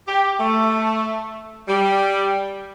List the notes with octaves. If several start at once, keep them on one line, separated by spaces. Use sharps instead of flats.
G4
A3
G3